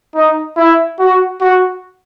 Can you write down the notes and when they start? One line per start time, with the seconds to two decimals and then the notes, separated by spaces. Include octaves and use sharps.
0.15 D#4
0.57 E4
0.99 F#4
1.41 F#4